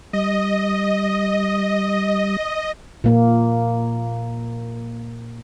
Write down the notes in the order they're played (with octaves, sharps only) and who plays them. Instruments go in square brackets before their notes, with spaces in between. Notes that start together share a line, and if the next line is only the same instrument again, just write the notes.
[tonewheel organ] G3 [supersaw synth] D#5
[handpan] A#2 A#3